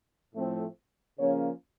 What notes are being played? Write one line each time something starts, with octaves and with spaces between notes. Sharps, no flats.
A2 F3 A3 C4
C#3 F3 A#3 C#4 C#5